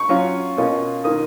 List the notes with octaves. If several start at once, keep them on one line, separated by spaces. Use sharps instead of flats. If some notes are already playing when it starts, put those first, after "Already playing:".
Already playing: C#6
F#3 C#4 F4
B2 A#3 C#4 F4
D#3 A#3 F4 D#6